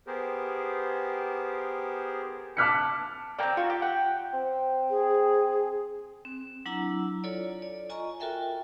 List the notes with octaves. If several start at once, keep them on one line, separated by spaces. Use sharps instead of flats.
B3 G4 G#4 A#4 C5
A5 D6 F6 F#6 B6 C#7
A#3 C4 D5 G5 A#5
F4 F#4
G4
F#5 G5
C4
G#4
C4
F#3 D4 E4 F#5 A#5 E6
F4 A4 C#5 D5
D5
F4 D#5 G#5 A#5 C#6
F4 F#4 A4 A#4 E5 G5